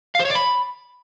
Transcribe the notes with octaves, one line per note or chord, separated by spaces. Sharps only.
F5
C5
C#5
D5
B5